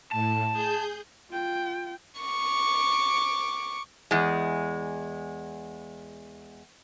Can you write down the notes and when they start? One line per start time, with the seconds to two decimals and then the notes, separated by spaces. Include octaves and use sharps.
0.12 A2 A5
0.52 G#4 G6
1.30 F4 G5
2.21 C#6 D6
4.11 E2 G#3